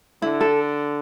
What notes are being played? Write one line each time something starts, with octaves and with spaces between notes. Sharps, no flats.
D3 E4
A4